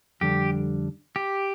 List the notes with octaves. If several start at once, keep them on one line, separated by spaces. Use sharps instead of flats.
F2 D3 G3 D4 G4
G4